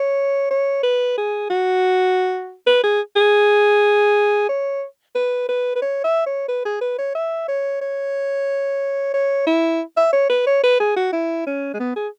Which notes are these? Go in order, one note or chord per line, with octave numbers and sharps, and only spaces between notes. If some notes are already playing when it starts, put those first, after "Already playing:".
Already playing: C#5
C#5
B4
G#4
F#4
B4
G#4
G#4
C#5
B4
B4
B4
C#5
E5
C#5
B4
G#4
B4
C#5
E5
C#5
C#5
C#5
E4
E5
C#5
B4
C#5
B4
G#4
F#4
E4
C#4
G#3
B3
G#4